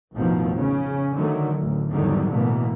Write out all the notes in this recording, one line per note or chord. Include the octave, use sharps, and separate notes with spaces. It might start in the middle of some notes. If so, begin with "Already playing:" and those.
A1 F2 B2 D#3 F3
C#3 C#4
D3 D#3 F#3 A3
A1 D2
E2 G#2 D3 D#3 F#3 G3
A1 B2 E3 A3 A#3